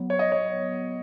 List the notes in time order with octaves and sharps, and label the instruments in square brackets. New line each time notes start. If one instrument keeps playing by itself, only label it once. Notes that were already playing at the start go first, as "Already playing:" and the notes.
Already playing: [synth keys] F#3 B3
[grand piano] C#5
D#5
C#5